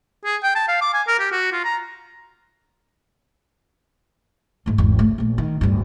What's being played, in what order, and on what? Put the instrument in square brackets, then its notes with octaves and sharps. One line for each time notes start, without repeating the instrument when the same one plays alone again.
[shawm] G#4
G5
A5
F5
D6
G#5
A#4
G4
F#4
F4
A#5
[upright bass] G#2 A3
G#1 E2
C#3 A3
A#1 A3
D#3
D1 G2